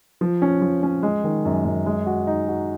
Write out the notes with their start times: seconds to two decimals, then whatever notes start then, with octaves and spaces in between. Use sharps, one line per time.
0.21 F3
0.42 C#4
0.61 F3
0.83 C#4
1.03 G#3
1.24 D#3
1.45 F#2
1.65 F#2
1.86 G#3
2.06 F#4
2.27 D#4
2.48 F#4